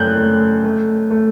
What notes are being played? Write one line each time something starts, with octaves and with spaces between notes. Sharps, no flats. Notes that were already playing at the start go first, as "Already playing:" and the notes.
Already playing: F#2 A3 F#6 G6
A3
A3
A3